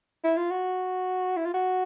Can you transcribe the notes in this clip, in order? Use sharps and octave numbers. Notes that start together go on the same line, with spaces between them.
E4
F4
F#4
E4
F4
F#4